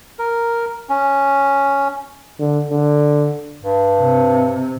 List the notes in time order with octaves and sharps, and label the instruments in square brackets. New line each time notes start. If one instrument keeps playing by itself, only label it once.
[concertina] A#4
C#4
[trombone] D3
D3
[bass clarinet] G2
[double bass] C3